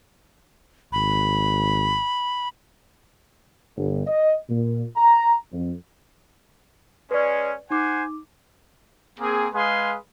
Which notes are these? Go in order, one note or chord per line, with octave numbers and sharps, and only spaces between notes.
G#1 B5
G1
D#5
A#2
A#5
F2
G#3 C#4 B4 D5
D#4 C5 F#5 G#5 D6
A#3 C4 G#4
G#3 G#4 B4 F5 G#5 C6